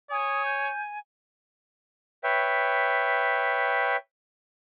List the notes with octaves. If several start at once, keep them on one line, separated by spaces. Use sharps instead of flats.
C#5 G#5 D#6
G6
B4 C#5 E5 G5